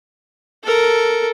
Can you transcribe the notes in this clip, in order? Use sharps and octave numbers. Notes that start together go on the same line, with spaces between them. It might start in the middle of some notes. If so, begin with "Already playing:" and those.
A4 A#4